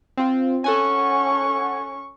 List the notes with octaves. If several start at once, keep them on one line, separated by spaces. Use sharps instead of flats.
C4 F4
C#4 A4 F#5 G#5 C#6